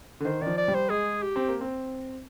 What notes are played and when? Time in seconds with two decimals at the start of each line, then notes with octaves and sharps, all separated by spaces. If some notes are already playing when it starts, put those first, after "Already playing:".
0.20 D3
0.25 D#3 C5
0.42 D#3 F3 D5
0.57 D5
0.68 G3
0.74 C5
0.90 G#3 G#4
1.22 G4
1.36 C4
1.48 A#3
1.61 C4